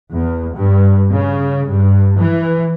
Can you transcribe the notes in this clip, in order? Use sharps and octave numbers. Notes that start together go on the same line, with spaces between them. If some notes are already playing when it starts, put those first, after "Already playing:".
E2
G2
C#3
G2
E3